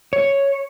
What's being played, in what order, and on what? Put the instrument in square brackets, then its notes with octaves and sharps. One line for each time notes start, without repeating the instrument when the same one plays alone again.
[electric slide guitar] C#5